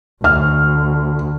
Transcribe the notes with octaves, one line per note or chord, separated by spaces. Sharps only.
D2 F6